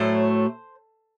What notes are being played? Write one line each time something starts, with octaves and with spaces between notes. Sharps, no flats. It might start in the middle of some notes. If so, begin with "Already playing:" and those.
Already playing: A2 F#3 A3 C5